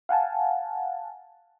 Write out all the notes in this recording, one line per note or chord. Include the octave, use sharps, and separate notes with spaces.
F5 F#5 G#5 A5